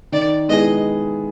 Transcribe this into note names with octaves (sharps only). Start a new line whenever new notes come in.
D#3 D5
G#3 B3 E4 G#4 D#5